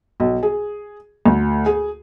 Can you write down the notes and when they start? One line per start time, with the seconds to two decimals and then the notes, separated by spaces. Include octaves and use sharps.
0.20 B1
0.43 G#4
1.26 D2
1.66 G#4